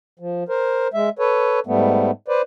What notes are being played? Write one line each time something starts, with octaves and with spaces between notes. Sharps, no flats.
F3
A#4 C5
G#3 E5
A4 B4 C#5
G#2 G3 A3 B3
B4 C5 D5